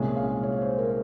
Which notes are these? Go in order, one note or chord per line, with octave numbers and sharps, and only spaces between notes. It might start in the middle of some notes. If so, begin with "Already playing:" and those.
Already playing: C2 A#2 G#3 C#4
F5
C#5
C5
A#4